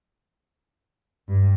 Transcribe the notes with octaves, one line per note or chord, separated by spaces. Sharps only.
G2